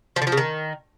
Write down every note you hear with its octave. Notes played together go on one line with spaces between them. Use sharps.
F3
D3
F3
C#3
D#3